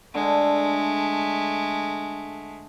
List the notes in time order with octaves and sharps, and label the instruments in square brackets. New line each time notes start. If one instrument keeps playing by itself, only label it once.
[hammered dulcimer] D3 [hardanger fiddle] G#3 A3